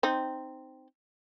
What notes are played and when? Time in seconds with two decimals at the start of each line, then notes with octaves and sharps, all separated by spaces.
0.03 C4 D#4